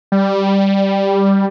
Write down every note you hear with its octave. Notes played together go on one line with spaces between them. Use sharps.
G3